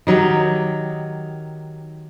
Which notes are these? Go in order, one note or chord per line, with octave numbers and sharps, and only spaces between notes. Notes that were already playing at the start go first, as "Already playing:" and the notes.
D#3 F#3 D#4 G4